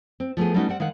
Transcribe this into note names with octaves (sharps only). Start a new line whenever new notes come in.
C4
F3 A3 B3 G#4
G3 A3 B3 C#4 D#4 F#4
G3 C4 F#5
D#3 G#3 F5 F#5